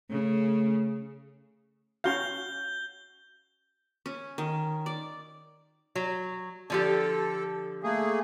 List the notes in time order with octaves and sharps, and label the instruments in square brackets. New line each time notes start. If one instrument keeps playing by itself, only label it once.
[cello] C#3 [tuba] A3
[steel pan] C#4 F#4 F5 [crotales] G6 G7
[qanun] C#4
D#3
D5
[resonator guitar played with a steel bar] F#3
[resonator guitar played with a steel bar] D3 F3 G4 [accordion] A4
[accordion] A3 A#3 G#4